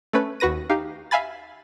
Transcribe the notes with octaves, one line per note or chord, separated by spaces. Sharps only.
A3 C#4 B4
D#2 F#4 B4 A#6 D#7
D#4 G4 F5
E5 F5 G#5 B5 A6